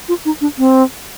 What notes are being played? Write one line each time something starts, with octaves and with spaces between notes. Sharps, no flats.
F4
D#4
D4
C4